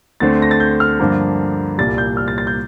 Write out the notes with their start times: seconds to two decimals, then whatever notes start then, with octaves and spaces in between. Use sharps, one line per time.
0.20 D2 D3 A3 C4 A6
0.42 A#6
0.51 A6
0.60 G6
0.80 F6
1.00 G2 D3 F3 A#3
1.78 C2 A#2 G3 A6
1.98 G6
2.17 F6
2.28 A6
2.38 A6
2.47 G6